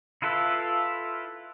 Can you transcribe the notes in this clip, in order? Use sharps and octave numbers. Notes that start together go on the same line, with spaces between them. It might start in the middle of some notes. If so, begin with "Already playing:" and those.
E4 F4 A4 B4